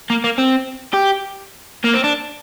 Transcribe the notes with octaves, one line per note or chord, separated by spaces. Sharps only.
A#3
A#3
C4
G4
A#3
C4
D4